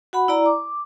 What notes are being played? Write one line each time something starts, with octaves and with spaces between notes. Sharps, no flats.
F#4 F#5 B5
E4 D5 A#5
D6